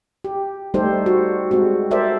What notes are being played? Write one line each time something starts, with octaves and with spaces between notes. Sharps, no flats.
G4
G3 A3 D#4 G4 A4 C5
F#4
G#3 C4 F#4
A4 A#4 C5 D5 E5